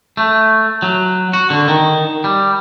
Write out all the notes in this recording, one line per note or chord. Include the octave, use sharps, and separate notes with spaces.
A3
F#3
F#4
D3
D#3
G3